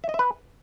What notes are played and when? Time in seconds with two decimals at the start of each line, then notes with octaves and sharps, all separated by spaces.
0.04 E5
0.09 D#5
0.14 E5
0.19 B4